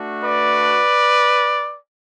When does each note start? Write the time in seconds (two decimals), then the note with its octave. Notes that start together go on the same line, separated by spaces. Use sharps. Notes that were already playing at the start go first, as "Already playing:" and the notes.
Already playing: A3 D4 F#4
0.22 B4 D5